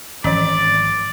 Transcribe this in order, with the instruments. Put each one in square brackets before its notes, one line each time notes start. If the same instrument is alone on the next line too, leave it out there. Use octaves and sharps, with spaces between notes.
[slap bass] G#1 [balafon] E3 F3 C#4 [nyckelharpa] D5